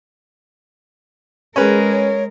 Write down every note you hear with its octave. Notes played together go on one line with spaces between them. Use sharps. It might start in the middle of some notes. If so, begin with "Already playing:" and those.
G#3 C#4 G#4 A#4 B4
C#5